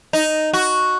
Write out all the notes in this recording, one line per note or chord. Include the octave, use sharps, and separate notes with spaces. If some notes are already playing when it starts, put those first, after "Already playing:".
D#4
F#4